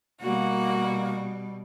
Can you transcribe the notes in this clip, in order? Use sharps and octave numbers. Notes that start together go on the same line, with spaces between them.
B2 G3 A#3 F#4